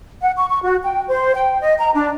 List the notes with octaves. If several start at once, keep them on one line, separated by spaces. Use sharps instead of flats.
F#5
C#6
C#6
F#4
G5
C5
G5
D#5
A#5
D4